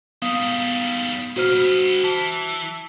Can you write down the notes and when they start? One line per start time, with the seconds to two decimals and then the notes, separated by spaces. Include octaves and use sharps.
0.22 G#2 G3 B3 F5 D#6
1.36 A#2 C#3 F#4 C5 F6
1.55 G2 B3
2.04 E3 A5